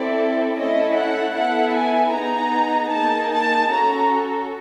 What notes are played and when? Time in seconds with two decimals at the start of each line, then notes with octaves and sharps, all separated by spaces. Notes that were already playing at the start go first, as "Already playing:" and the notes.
Already playing: C4 E4 A4 D5
0.57 A3 C#4 E4 A4 D#5
0.97 F#5
1.36 B3 E4 A4 F#5
1.75 G#5
2.14 B3 D#4 G#4 A#5
2.92 A#3 D#4 G#4 A5
3.32 A5
3.71 C#4 F#4 A4 A#5